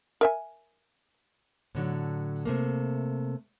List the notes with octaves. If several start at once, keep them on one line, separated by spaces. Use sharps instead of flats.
A#4 E5 G#5
A2 D3 F#3
C3 A3 A#3